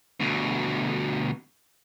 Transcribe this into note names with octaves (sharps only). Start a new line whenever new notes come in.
D2 B2